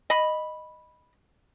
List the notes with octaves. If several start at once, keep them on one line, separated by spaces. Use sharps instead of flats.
D#5 B5